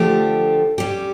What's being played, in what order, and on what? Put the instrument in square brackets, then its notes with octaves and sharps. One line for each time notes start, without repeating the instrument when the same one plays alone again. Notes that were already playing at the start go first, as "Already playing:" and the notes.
Already playing: [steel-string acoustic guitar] D3 F3 A3 D4 G4
G3 C#4 G4